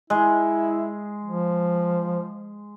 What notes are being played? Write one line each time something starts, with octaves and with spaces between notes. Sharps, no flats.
G#3 E4
F3